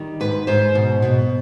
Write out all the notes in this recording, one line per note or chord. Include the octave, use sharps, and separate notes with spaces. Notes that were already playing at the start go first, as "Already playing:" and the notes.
Already playing: D#3 G3
G#2 B4
G#2 C5
B2
B2